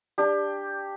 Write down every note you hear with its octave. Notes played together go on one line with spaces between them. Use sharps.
D4 G4